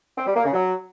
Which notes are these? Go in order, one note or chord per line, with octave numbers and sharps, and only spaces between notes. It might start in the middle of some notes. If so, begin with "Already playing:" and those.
C4
G3
A#3
C#3
F#3